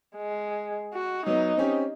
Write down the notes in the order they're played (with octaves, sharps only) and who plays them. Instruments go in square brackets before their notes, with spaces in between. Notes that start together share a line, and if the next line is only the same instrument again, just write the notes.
[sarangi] G#3
F#4
[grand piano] F#3 B3 [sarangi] D#4
[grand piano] C4 C#4 G4